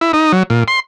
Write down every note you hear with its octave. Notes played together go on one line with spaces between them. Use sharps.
E4
D#4
F#3
A#2
C6